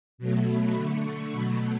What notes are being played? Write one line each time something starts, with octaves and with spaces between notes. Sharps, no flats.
B2 F#3 A3
B5
D3 A3 C#6
B2 F#3 A3 B5